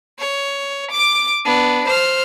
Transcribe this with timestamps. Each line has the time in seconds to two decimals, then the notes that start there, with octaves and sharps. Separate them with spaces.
0.19 C#5
0.91 D6 D7
1.45 B3 D4
1.88 C5 F6